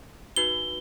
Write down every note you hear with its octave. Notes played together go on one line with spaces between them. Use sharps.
D#4 F#4 B4 G7